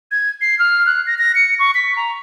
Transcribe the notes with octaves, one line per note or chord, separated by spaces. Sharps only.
G#6
C7
F6
F#6
A#6
A#6
C#7
C#6
B6
A#5